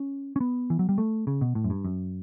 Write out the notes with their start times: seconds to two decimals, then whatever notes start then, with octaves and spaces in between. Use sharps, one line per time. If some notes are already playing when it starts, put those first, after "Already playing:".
Already playing: C#4
0.36 C#4
0.40 B3
0.70 E3
0.79 F#3
0.89 G3
0.98 A3
1.27 C#3
1.41 B2
1.55 A2
1.64 F#2
1.70 G2
1.85 F#2